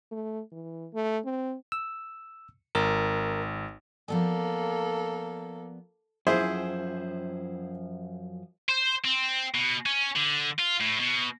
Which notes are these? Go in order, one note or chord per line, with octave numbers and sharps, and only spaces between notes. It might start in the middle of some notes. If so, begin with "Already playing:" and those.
A3
E3
A3
C4
E6
G#1 A#4
F3 A#3 B3 A4 D5
F#2 F3 E4 G#4 C5
C5
C4
B2
C#4
D3
F4
A2
B2